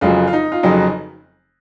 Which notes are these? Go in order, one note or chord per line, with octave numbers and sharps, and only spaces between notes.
F1 F2 C#3 F#3 F4
F4
D#4
F4
F1 F2 C#3 F#3 D#4